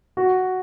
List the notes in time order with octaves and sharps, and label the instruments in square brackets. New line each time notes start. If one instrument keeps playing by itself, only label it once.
[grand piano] F#4